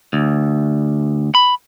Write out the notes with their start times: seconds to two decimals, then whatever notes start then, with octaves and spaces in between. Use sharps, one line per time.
0.13 D2
1.35 B5